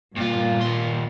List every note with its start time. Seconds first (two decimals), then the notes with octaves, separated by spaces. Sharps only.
0.17 G2 A#2 F4
0.61 D#2 C6